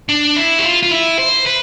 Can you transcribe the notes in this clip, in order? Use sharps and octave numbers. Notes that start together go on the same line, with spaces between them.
D4
E4
G4
F4
F4
E4
C5
B4